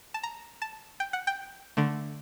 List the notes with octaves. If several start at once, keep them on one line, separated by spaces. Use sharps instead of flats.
A5
A#5
A5
G5
F#5
G5
D3 A3